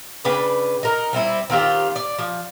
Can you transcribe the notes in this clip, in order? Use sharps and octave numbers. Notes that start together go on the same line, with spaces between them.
C#3 D4 B4 G5
D#4 A#4
G3 C4 E4
D#3 C4 F4 G4
D5
F3